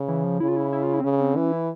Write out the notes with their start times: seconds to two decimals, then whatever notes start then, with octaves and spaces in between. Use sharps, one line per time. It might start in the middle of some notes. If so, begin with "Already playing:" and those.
Already playing: C#3
0.08 E3
0.24 F3
0.40 C#3 E4
0.48 F4
0.56 E4
0.73 E4
0.83 F4
0.93 E4
1.00 C4
1.04 C#3 C#4
1.20 C4
1.36 E3 C#4
1.52 E4